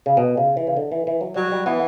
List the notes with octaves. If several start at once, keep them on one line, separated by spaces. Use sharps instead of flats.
C#3
B2
C#3
E3
C#3
D3
E3
E3
F#3
F#3 G3
G3
E3 B3